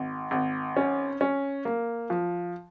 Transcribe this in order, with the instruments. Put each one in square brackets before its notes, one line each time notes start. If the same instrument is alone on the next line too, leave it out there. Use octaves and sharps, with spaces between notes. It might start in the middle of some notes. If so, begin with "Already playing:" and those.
Already playing: [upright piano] G#1
G#1
C#4
C#4
A#3
F3